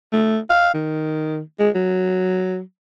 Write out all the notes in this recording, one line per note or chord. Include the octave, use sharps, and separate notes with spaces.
A3
F5
D#3
G#3
F#3